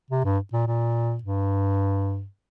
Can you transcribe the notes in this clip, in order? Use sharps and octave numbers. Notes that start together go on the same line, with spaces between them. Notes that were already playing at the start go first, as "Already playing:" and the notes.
C3
G2
A#2
A#2
G2